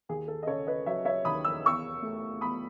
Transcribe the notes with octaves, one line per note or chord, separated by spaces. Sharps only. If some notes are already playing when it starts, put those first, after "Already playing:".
D#2 G#4
A4
D#5
C#3 A4 C#5
B4 D#5
F#3 C#5 E5
C#5 E5
D#2 B5 D#6
E6
E2 C#6 E6
A3
E2 B5 D#6